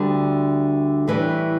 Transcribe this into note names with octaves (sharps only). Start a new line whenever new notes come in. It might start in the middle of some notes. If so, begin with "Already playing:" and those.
Already playing: D2 D3 G3
A2 E3 G3